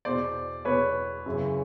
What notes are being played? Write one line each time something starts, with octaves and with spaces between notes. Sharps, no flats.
E2 B2 C5 D5
E2 B2 B4 C#5
F#2 C#3 E3